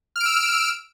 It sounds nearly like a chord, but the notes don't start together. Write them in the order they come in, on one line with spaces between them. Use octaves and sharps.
F6 D7 E6